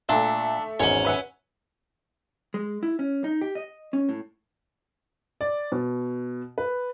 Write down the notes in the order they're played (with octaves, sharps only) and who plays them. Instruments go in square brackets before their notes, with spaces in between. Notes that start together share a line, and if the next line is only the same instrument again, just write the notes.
[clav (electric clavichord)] A#2 [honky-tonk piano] A3 E5 [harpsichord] D4
[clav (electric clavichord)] G#1 E2 G#2 [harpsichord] C#4 C#5
[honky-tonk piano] B4 E5 F#5
[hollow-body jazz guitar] G#3
E4
C#4
D#4
G4
D#5
C#4
A2
[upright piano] D5
B2
B4